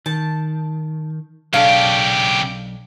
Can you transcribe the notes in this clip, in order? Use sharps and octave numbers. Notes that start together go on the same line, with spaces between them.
D#3 A5
B1 C#3 D4 G4 A4 F5